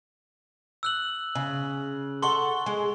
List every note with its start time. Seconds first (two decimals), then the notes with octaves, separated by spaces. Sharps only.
0.83 E6 F#6 F#7
1.35 C#3
2.22 A4 F#5 C6 C#6 G7
2.66 G#3